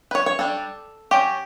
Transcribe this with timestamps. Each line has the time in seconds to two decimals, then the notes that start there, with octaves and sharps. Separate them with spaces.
0.11 B4
0.15 C#5
0.26 C#5
0.39 G3 D4 A4
1.11 F#3 C#4 G4